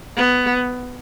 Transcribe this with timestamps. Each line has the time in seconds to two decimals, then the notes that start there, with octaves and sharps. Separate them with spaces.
0.17 B3